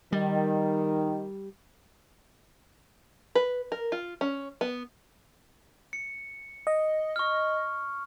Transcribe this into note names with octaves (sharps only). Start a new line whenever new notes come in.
D#3 G3
B4
A#4
F4
C#4
B3
C#7
D#5
C#6 F6